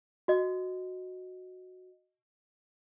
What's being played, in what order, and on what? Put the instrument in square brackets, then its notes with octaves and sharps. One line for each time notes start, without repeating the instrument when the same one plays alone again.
[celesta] F#4 D#5